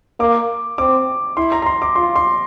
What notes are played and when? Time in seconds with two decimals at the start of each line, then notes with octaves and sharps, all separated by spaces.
0.20 A#3 D6
0.78 C4 D6
1.37 E4 C6
1.52 A#5
1.62 A#5
1.66 C6
1.82 D6
1.96 F4 C6
2.16 C6